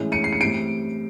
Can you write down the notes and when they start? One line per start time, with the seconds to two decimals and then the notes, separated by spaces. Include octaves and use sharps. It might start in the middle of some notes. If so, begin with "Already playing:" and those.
Already playing: A2 E3 G#3 C#4
0.12 C#7 D#7
0.24 C7
0.33 C#7
0.41 A2 E3 G3 C4 C7 D7